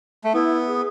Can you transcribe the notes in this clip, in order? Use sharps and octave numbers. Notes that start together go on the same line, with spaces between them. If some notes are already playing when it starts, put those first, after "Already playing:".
A3
B3 E4
G#4